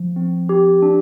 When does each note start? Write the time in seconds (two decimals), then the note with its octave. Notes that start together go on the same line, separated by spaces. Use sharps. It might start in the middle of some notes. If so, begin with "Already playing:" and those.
Already playing: F3
0.16 C4
0.49 G4
0.82 D4